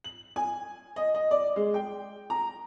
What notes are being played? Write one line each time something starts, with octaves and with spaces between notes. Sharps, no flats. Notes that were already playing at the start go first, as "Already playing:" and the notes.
F#7
G#5
D#5
D#5
D5
G#3
G5
A#5